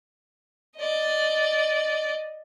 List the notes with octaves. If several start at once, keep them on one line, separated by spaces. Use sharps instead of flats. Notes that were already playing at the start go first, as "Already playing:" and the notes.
D5 D#5